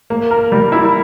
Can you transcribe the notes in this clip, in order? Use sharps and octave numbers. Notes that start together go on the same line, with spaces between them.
A#3
A#4
G3
E4